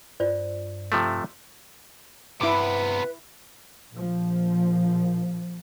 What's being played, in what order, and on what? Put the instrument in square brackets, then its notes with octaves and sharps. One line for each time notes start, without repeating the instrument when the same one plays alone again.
[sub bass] G2 [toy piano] F4 C5 D5
[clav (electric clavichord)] C3 F3 A3
[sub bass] G2 [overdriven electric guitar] C3 B3 [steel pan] E4 D6 [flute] B4
[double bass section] A#1 F3